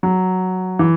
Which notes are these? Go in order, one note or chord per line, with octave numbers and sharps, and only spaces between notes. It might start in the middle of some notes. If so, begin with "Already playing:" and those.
F#3
E3